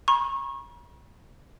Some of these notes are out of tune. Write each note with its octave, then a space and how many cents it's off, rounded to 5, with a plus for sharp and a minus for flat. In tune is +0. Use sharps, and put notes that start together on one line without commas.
A#5 +45 C#6 -30